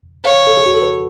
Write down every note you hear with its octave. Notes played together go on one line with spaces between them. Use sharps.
C#5 F5
A4
G#4
F#4
A4
B4